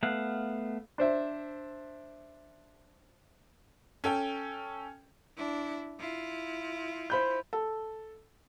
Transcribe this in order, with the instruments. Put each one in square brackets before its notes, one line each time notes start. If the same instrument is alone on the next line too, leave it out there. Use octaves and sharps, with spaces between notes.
[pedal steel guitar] A3 B3 F5 F#5
[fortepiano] D4 C5 E5
[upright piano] C#4 A4 G5
[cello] D4 E4
E4 F4
[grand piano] C5 B5 G6
[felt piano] A4